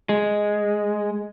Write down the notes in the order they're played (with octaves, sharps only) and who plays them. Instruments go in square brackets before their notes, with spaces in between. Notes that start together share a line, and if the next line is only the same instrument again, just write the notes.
[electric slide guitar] G#3